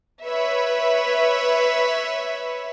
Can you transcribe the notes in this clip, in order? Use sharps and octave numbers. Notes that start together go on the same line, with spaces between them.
B4 C#5 E5